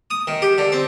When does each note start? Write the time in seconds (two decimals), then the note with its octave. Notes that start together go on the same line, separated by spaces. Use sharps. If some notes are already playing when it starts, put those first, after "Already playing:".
0.11 D#6
0.27 D#3
0.42 G4
0.58 D3
0.72 C4